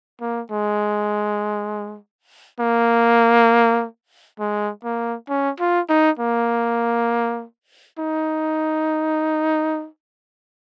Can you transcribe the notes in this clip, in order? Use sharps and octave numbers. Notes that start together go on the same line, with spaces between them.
A#3
G#3
A#3
G#3
A#3
C#4
F4
D#4
A#3
D#4